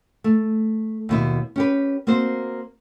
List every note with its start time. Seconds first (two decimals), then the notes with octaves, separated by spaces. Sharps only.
0.24 A3
1.09 D#2 B2 E4
1.56 C#4 G4 B4
2.07 A#3 C4 F#4 C5